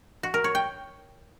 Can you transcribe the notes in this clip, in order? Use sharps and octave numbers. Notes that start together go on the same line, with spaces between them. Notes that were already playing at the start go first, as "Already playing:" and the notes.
F#4
A#4
C#5
G5